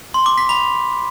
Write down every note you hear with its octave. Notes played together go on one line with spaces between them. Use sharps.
C6
D6
B6
B5